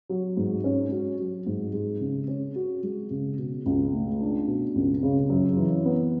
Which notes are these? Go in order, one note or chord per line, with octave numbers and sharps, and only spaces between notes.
F#3
G#2
C#4
F#4
F#3
G#2
G#3
C#3
C#4
F#4
G#3
C#3
B2
C#2
A3
D4
B2
C#2
C#3
F#2
E3
B3